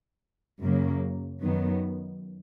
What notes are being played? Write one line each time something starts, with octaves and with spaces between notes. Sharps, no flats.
F#2 C#3 F#3 A#3
F#2 D#3 F#3 B3